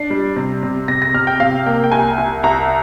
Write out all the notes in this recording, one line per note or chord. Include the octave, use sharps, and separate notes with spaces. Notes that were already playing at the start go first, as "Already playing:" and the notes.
Already playing: D4 C7
G3
C3
C3
C3 A#6
A#6
C3 F6
G5
C3 F5
A#3 G5
G5
C2 G#5
C2
C2 A#5